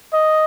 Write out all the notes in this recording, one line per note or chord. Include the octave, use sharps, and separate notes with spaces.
D#5